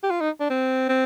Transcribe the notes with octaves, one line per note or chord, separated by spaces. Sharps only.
G4
F4
D#4
D4
C4
C4